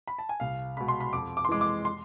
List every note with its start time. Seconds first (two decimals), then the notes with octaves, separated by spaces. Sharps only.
0.07 B5
0.19 A5
0.29 G#5
0.40 C2 F5
0.77 B2 G#3 B5
0.88 C6
1.00 B5
1.13 F2 D6
1.37 D6
1.45 C6
1.49 E3 G#3 D6
1.61 D6
1.85 C6